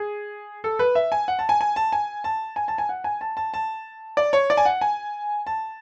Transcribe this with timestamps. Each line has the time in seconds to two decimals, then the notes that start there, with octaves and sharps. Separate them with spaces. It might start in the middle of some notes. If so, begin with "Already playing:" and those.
Already playing: G#4
0.64 A4
0.79 B4
0.95 E5
1.12 G#5
1.28 F#5
1.39 A5
1.49 G#5
1.61 G#5
1.76 A5
1.92 G#5
2.24 A5
2.56 G#5
2.68 A5
2.78 G#5
2.89 F#5
3.04 G#5
3.21 A5
3.37 A5
3.54 A5
4.17 D5
4.33 C#5
4.50 D5
4.57 G#5
4.65 F#5
4.81 G#5
5.47 A5